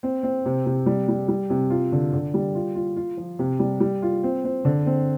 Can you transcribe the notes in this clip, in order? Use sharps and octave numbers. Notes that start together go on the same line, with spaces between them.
C4
C4
C3
C3
G3
G3
G3
C3
F4
D3
D3
G3
F4
F4
F4
F3
C3
G3
G3
F4
C4
C4
D3
C4